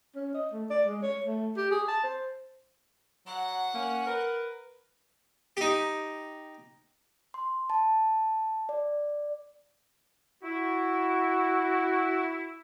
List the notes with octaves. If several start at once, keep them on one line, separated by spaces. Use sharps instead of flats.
C#4
D#5
A3
D5
G#3
C#5
A3
G4
G#4
A5
C5
F#3 F#5
A#3 C#4
A#4 B4
D#4 G4
C6
A5
D5
E4 F#4